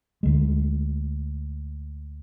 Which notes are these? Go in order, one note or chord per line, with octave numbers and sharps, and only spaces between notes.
D2 G#3